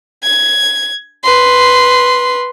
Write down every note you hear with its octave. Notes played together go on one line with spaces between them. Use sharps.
G#6
B4 C6